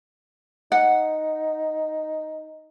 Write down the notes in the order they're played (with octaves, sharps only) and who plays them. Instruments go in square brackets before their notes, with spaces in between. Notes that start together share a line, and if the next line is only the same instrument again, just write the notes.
[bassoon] D#4 [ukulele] F#5